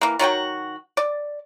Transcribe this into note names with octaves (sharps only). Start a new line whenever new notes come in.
E3 A#3
D#3 F#3 F#4 G5
D5